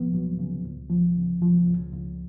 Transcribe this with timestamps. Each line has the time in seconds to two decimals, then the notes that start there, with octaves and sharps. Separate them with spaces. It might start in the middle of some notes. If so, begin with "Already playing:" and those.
Already playing: C#2 F3 B3
0.14 F#3
0.39 C#3
0.65 C#2
0.90 F3
1.17 C#3
1.42 F3
1.68 C#2
1.94 C#2